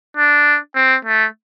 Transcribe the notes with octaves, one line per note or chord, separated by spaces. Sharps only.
D4
C4
A3